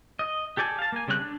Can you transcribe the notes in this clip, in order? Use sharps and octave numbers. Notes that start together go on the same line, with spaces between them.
D#5
G4 A4 D5 G#5
F5 A5
A#3 G#5
C#3 G3 C4 C#5 F#6
D4